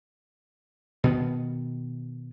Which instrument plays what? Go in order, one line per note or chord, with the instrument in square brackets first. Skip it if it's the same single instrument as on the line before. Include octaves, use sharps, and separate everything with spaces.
[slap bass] B2 D#3 B3